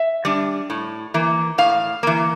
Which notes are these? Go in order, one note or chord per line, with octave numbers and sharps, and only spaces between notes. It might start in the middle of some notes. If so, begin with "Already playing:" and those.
Already playing: E5
G3 D4
A2
E3 A#3
A2 F5
E3 A#3